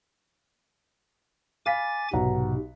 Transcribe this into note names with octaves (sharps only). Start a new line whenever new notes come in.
F5 G#5 B5 D6 A6 B6
B1 G#2 C3 F#5 A#5